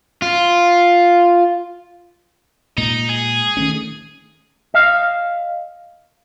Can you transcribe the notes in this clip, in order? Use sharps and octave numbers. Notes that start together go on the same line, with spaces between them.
F4
A#2 G#3 D#4
G#4
D#3 A3 C#4
D#5 F5